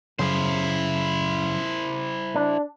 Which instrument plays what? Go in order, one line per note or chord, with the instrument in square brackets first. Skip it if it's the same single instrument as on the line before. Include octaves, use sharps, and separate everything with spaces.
[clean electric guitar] F#2 C#3 [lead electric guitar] E4 C5
[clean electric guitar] D4